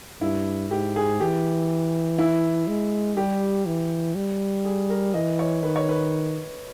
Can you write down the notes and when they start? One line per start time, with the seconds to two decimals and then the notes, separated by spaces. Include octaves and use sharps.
0.21 G2 E4
0.71 G#2 G4
0.96 G#4
1.20 E3 G4
2.18 E4
2.67 G#3
3.17 G3 G4
3.66 E3
4.15 G3
4.65 G#4
4.90 A#4
5.14 E3 D#5
5.39 C#5
5.63 D#3 B4
5.76 C#5
5.89 B4